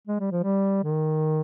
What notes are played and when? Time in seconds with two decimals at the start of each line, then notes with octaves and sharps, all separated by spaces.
0.07 G#3
0.20 G3
0.31 F3
0.43 G3
0.84 D#3